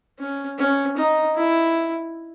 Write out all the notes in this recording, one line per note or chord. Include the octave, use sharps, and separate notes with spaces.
C#4
C#4
D#4
E4